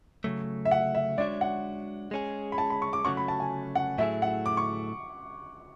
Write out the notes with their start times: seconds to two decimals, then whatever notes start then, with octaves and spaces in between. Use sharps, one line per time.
0.24 C#3 F#3 A3
0.65 E5
0.71 F#5
0.95 E5
1.18 G#3 D4 F#4 C#5 D5 E5
1.41 F#5
2.11 G#3 C#4 G#4
2.52 B5
2.58 A5
2.70 B5
2.82 C#6
2.93 D6
3.05 C#3 F#3 A3 C#4 F#4 C#6
3.17 B5
3.28 A5
3.40 G#5
3.75 F#5
3.98 A2 F#3 A3 E4 G#4 E5
4.22 F#5
4.46 D6
4.57 C#6